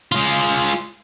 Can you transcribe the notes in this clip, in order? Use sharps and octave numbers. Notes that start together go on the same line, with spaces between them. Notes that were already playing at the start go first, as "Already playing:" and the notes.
G#3 F4